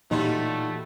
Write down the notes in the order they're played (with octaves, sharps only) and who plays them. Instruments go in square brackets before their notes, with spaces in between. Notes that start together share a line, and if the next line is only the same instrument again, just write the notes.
[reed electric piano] A#2 E3 D#4 [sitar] F#3 G3 F4 [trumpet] A3